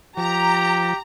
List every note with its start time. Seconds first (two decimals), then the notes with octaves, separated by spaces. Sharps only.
0.17 F3 G4 A#5